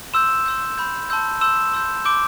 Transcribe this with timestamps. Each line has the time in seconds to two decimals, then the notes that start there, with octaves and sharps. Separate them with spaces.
0.14 C6 E6 G6 E7
0.46 C6 E6 G6
0.78 B5 E6 G6
1.10 A5 C6 E6 G6
1.41 C6 E6 G6 E7
1.73 C6 E6 G6
2.05 C6 D6 G6 D7